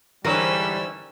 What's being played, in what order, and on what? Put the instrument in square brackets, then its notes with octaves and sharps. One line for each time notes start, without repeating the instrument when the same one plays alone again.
[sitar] G#2 D3 E3 [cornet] G3 [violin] C#4 E6 [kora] A#4